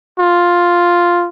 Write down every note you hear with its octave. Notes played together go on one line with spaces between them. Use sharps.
F4